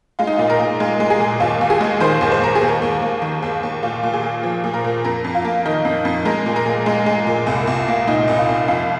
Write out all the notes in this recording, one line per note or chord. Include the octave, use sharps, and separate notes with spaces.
G#3 F4
D#4
A#2 F4
A#4
A#2
G#3
G#3
G#4
A#2
D#2 F4
D#2
G#4
G#3
D#3 C5
D#2
C5
D#2 A#4
G#4
D#2
A#4
D#2
A#3
D#3
D#2
D#2
A#2 F4
A#2
G#4
A#3
F3
A#2
A#4
A#2
F2 A#4
F2
F4
A#3
D#3 D#4
F2
F2
G#3 A#4
A#2
A#4
A#2
G#3
G#3
A#2
C2
C2
A#3
A#2 D#4
C2
F4
C2
F2 F4